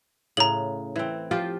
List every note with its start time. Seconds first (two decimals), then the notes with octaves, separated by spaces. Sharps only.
0.37 A2 C#3 A#5 F#7
0.96 E3 C4
1.31 F3 F4 G4